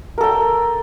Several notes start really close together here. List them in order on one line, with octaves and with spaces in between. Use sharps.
A#4 A4 G5